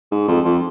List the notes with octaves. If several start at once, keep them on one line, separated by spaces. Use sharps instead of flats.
G#2
F2
F2